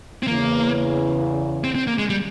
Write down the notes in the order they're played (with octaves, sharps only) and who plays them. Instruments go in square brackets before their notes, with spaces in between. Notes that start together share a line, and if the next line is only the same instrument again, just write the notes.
[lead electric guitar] C4
[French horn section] E2 C#3 E3 [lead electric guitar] A#3
[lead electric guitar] C4
C4
A#3
G#3
G3